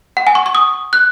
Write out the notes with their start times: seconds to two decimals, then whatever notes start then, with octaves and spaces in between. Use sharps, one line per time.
0.17 F#5
0.27 G#5
0.35 C#6
0.46 C#6
0.55 D#6
0.93 F#6